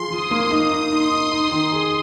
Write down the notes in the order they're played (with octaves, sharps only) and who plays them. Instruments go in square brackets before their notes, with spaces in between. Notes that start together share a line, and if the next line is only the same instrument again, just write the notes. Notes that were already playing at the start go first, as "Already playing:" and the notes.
Already playing: [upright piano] F3 F4 G#4 [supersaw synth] C6
[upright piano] F3 [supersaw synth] D#6
[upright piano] A#3
[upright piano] D#4 [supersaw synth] D#6
[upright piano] D#4
[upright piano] D#4 [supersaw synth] C6
[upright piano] D#4
D#4
D#3
G#4